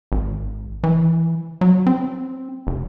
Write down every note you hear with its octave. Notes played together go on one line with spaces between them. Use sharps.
G#1
E3
F#3
C4
F1